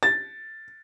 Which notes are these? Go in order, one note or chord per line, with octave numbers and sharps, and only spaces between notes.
A6